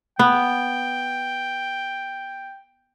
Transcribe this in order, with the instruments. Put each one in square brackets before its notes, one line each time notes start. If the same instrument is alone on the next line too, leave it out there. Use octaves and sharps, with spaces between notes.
[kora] B3 [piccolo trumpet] G5